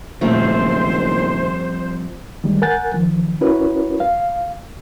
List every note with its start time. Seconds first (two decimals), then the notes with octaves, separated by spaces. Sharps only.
0.21 F#1 A#2 D#3 F3 G3 A3 C4 C5
2.44 D#3 G3 G#3
2.62 A#4 F#5 G#5 F#6 G6 A6
2.94 D#3 F3
3.41 C#4 E4 F#4 A#4 B4 C#5
4.00 F5